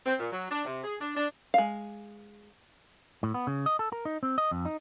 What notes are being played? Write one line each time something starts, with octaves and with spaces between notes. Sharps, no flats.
C4
A#2
F#3
D4
C3
G#4
D4
D4
G#3 F5
A2
B3
C#3
D#5
A4
A#4
D#4
C4
D#5
F2
D#4